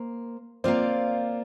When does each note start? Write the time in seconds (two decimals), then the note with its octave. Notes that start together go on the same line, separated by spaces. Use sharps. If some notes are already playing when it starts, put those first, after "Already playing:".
Already playing: A#3 C5
0.64 A#3 C4 F4 D5